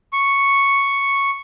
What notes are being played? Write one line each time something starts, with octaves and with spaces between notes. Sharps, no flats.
C#6